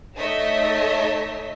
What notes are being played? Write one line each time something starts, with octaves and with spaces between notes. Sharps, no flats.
A3 D#4 C#5 D#5 E5 B6